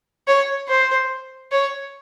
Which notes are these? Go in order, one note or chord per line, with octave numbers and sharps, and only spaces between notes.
C#5
C5
C#5